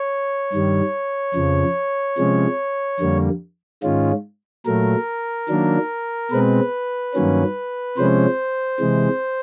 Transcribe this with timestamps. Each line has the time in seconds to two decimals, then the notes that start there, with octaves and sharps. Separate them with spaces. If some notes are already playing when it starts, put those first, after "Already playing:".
Already playing: C#5
0.53 G2 D#3 G3
1.35 F2 C#3 F3
2.18 C3 F3 G#3 C#4
3.00 F2 D3 G3 A#3
3.83 G#2 D#3 G#3 C#4 F4
4.66 A#2 F#3 A3 A#4
5.49 D#3 F#3 A#3 D4
6.31 B2 G#3 C4 B4
7.14 G2 D#3 F#3 A#3 C#4
7.97 C3 F3 G#3 C#4 C5
8.80 C3 E3 G#3